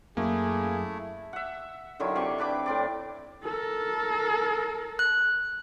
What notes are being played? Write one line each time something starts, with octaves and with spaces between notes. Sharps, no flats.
F#2 A3 A#3 E4 G#4
E5 F#5
D3 D#3 F#3 E4
C3 G5 C#6 D6
D4 B4 B5 D6
A2 C4 D5
A4 A#4
F#6